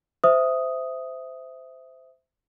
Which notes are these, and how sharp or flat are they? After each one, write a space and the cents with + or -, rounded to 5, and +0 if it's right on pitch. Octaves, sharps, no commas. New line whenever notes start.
C5 -20 E5 +0 D#6 +0